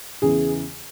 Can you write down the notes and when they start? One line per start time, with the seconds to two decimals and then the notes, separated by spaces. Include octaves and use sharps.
0.22 E2 C#3 E3 G#4